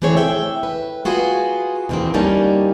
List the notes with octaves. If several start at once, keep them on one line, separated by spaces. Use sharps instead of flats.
E3 A3 C4 G#4 C#5
E5 G5
B4
F4 F#4 G#4 B4
E2 G#2 D#3 A3 A#3 C4
D2 G3 A#3 C#4 D#4 A5